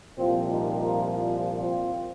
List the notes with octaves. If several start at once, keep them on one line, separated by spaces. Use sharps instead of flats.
C2 A#2 F3 C4 F4
D#4 G4
F4 A#4
C4 F4